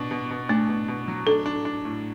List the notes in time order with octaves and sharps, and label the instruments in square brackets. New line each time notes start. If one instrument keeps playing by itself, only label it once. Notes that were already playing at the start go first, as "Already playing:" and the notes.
Already playing: [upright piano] B2 D4
B2
B2
[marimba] A3 [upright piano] D4
[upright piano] B2
B2
F#3
[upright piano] D4 [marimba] A4
[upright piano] D4
D4
A2